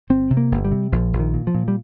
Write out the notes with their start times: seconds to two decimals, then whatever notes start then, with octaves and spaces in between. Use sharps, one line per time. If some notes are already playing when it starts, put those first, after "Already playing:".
0.10 G1 C4
0.30 C3
0.37 A#3
0.52 G1
0.65 G3
0.72 C3
0.92 A#1 F3
1.13 A#1
1.20 D#3
1.34 A#2
1.47 F3
1.54 A#2
1.68 G3